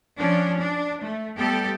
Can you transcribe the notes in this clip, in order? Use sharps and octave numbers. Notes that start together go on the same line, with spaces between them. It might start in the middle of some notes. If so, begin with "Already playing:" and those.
F3 C#4 D4
D4
A3
G3 A3 B3 G4 A4